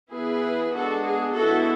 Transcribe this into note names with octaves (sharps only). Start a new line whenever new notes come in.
E3 B3 E4 G#4 B4
G#3 B3 D4 F#4 A4
G#4
D3 G#3 B3 E4 F#4 A4